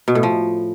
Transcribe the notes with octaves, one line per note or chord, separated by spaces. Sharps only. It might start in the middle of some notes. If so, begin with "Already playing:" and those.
B2
A2
F3